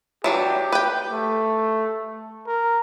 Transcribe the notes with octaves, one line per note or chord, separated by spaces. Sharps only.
E3 F#3 D4 G4
B4 G5
A3
A#4